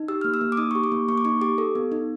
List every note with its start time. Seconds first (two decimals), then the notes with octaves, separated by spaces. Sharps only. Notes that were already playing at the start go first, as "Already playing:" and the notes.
Already playing: D#4
0.08 G4 E6
0.21 A#3 F6
0.34 E6
0.41 A#3
0.52 D6
0.57 D#4 D#6
0.71 G4 C#6
0.84 D6
0.92 A#3
1.08 A#3 C#6
1.18 D6
1.25 D#4 C#6
1.41 G4 D6
1.58 A4
1.75 B3
1.92 D#4